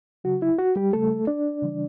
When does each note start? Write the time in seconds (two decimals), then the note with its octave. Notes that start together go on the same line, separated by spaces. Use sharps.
0.24 C#3 F#3 F#4
0.42 E4
0.58 F#4
0.76 G3 G4
0.93 C#3 G3 A3 A4
1.27 D4 D5
1.62 C#3 E3 G3